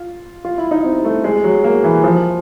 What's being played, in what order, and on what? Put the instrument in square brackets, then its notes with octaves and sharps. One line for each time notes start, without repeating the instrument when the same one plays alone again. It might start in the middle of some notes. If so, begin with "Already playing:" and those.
Already playing: [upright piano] F4
F4
E4
D#4
C4
A3
G#3
F#3
A#3
E3
F3